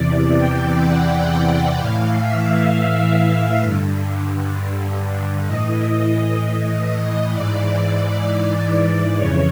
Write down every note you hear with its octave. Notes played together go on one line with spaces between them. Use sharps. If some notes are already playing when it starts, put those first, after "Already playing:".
Already playing: E2 C3 E3 D5
G5
F#5
A2 E3 F5
E5
G2 D3
A2 E3 D#5
G#2 E3 D5
F2 C#3 E3 C#5